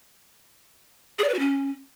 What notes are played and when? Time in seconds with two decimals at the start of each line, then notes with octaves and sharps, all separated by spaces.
1.19 G#4
1.24 D5
1.29 B4
1.34 F#4
1.39 C#4